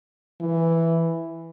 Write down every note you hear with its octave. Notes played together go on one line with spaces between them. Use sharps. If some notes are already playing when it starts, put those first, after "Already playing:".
E3